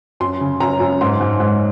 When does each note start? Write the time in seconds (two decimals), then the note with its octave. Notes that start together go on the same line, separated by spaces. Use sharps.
0.20 F#2 C6
0.41 C#3
0.60 F#2 A#5
0.80 F#2
1.01 G#2 C6
1.21 G#2
1.40 G#2